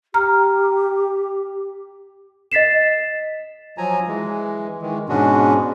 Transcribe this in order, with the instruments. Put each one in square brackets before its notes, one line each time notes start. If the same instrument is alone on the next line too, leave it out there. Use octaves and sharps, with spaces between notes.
[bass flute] G4 [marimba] A#5 F6
[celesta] D#5 A6 B6 C7 E7
[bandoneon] F3 F#3 G#5 A#5
E3 G#3
D#3 E3 G#3
G#2 B2 G#3 C#4 D4 F#4